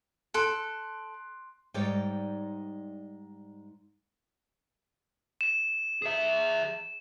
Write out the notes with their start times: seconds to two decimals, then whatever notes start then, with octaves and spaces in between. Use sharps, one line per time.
0.34 A4 C6 F#6 D7
1.74 G#2 G3 D#4 C#5 D5 G5
5.41 E7
6.02 G#4 E5